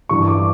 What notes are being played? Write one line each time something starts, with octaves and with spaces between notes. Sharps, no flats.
G2 E3 C#6
D6